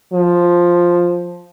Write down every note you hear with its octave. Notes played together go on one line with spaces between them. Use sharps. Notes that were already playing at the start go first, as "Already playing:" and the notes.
F3